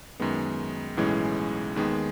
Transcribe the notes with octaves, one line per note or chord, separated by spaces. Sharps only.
F#2 D#3 G#3 B3
B1 A2 E3 G#3 C#4
D#2 D#3 G#3 B3